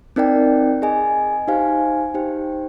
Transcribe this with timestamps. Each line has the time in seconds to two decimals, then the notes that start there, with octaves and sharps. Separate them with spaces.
0.16 C4 D#4 A#4 D5 G5
0.82 G#4 D#5 G#5
1.48 D#4 G4 C5 F5 G#5
2.14 D#4 G4 C5 G5